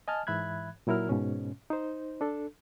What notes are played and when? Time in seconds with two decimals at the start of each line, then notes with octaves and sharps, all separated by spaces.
0.08 D#5 G#5 A5 F6
0.27 G#2 E3 E5 B5 F#6 G#6
0.87 A#2 F#3 E4 A#4 F6
1.09 G#2 B2 C#4
1.70 D#4 C5
2.21 D4 A4